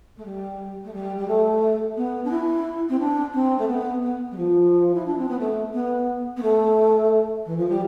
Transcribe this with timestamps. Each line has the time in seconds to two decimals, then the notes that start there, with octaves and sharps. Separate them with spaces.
0.17 A3
0.25 G3
0.84 A3
0.92 G3
1.16 G3
1.27 A3
1.96 B3
2.24 D4
2.30 E4
2.89 C4
2.99 D4
3.33 C4
3.58 A3
3.67 B3
4.02 B3
4.31 G3
4.37 F3
4.94 E4
5.05 D4
5.17 C4
5.28 B3
5.39 A3
5.73 B3
6.36 B3
6.42 A3
7.45 E3
7.57 F3
7.68 G3